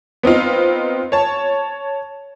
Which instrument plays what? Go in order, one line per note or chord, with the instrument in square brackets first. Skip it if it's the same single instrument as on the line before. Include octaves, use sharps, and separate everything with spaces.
[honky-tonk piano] B3 C4 D#4 F4
C#5 A5